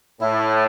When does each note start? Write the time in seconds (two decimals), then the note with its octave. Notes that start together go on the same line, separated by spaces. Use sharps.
0.21 A2 E4